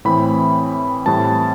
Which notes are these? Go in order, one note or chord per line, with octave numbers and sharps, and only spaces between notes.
A2 E3 A3 C4 B5
A2 E3 G3 C4 A5